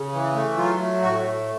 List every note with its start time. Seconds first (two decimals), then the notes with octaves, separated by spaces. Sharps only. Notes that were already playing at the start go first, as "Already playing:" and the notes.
Already playing: C#3
0.13 E3
0.34 A3
0.57 F#3 F4
0.79 A3
1.01 A2 F#4
1.24 A3